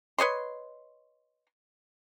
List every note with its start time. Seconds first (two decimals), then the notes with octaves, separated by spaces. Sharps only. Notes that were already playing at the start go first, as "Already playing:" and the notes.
0.18 B4 C#5 D#5 C6